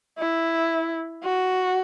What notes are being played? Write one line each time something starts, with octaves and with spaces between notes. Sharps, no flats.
E4
F#4